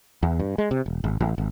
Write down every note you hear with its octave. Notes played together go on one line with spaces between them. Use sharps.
E2
G2
G#3
C3
E1
G#1
A1
G#1